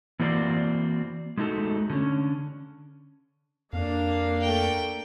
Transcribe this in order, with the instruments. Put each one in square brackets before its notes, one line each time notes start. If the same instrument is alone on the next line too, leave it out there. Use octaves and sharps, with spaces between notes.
[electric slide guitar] E3 A#3 C4 F#4 C5 D5
G#3 A3 D#4 F#4 A4
D3 C#4
[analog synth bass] F2 [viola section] A#3 D4 [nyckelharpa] F5
[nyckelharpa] A3 G5